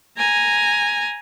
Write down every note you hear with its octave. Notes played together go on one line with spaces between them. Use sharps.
G#5 A#5